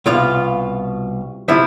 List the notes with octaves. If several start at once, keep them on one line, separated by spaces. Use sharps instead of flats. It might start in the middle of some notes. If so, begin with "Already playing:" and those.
C2 B2 F4 F5
C3 F3 E4 E5